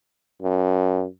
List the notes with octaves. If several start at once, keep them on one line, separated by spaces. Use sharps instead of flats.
F#2